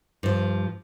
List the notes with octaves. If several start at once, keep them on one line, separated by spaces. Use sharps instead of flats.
G2 F3